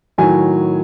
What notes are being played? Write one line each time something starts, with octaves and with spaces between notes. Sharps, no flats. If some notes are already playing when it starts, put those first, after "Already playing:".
A2 D#3 F#3 G#5